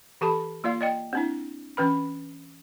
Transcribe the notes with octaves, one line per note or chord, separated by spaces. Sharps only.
E3 G4 A4 A5 B5
A#3 F4 D5 F5
D5 D#5 G5
C4 D4 E4
E3 C#4 B4 B5